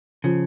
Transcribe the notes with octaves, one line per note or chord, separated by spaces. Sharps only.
C#3 F3